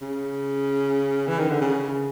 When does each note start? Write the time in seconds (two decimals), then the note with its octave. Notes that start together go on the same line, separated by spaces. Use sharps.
0.02 C#3
1.28 E3
1.39 D#3
1.50 D3
1.61 C#3